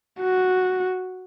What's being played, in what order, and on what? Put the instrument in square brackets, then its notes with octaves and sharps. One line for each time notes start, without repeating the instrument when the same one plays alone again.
[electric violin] F#4